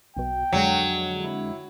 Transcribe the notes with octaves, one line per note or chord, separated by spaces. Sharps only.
B1 B2 G5
F2 D3 F#3 G#3
E4